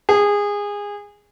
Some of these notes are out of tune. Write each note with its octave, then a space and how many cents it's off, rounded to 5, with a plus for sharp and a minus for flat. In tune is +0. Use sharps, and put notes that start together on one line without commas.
G#4 -20